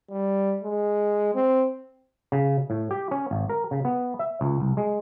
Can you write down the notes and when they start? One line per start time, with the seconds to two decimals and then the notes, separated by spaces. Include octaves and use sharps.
0.11 G3
0.63 G#3
1.35 C4
2.32 C#3
2.70 A2
2.91 G4
3.11 C#4
3.31 G#1
3.49 A#4
3.71 C#3
3.85 B3
4.19 E5
4.41 C#2
4.60 C2
4.77 G#3